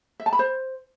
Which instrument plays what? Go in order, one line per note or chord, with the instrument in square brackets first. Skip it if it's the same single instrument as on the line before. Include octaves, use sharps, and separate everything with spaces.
[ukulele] E5
A5
B5
C5